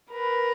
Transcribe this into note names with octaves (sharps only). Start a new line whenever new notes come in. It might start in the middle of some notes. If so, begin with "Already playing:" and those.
A#4 B4